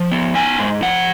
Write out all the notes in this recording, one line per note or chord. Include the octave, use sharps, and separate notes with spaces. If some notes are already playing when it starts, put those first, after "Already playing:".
Already playing: F3
B3
D#4 G#5
G#2
F3 F#5